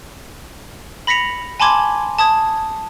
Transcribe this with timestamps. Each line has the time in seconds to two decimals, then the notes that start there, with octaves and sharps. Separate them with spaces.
1.07 B5 A#6 B6 C#7 F7
1.60 G#5 A5 B5 C6 D6 G#6
2.18 A5 D#6 G#6